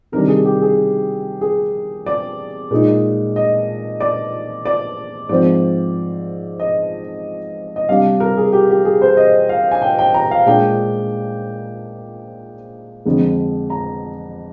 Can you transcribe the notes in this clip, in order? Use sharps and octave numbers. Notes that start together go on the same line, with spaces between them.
C3 D#3 G3 D4 A#4
G#4
G4
G#4
G#4
D5
A#2 G#3 D#4
D#5
D5
D5
G#2 F3 C4 D5
D#5
D#5
C3 G3 D4 F5
A#4
G#4
G4
G4
G#4
C5
D#5
F5
G#5
G5
G5
A#5
F5
A#2 G#3 D4 G5
F2 D3 G#3
A#5